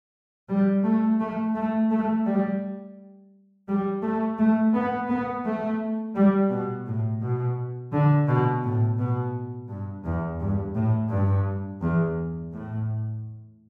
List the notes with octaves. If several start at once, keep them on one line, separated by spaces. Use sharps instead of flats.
G3
A3
A3
A3
A3
G3
G3
A3
A3
B3
B3
A3
G3
B2
A2
B2
D3
B2
A2
B2
G2
E2
G2
A2
G2
E2
A2